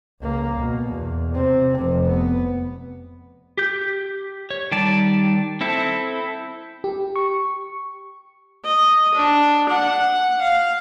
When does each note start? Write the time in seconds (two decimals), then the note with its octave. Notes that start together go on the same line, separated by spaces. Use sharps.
0.22 C#2 A#3
0.60 B2
0.94 E2
1.35 C3 C4
1.76 F1 C3
2.07 B3
3.57 G4 G6
4.51 C#5
4.72 D#3 G3 D5 A5
5.61 C4 E4 A4
6.84 G4
7.16 C#6
8.65 D#5
9.15 D4
9.70 F#5
10.42 F5